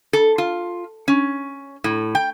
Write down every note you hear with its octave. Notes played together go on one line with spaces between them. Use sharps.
A4
F4
C#4
A2
G5